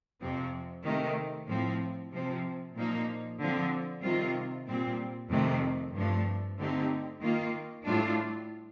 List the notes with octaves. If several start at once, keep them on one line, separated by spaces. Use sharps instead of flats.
F2 C3 F3 C4
C3 D#3 A3
A2 F3 C4
C3 F3 C4
A#2 F3 A#3 D#4
D3 F3 C4
C3 D#3 G3 C4 F4
A#2 G3 C4
F2 C3 D#3 A3 C4
G2 F3 A3 D4
D3 A3 C4 D#4 G4
D#3 A#3 F4
A2 G3 D4 F4